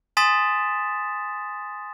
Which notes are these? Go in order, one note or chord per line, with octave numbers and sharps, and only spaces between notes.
G#5 C6 D#6 A6 B6 E7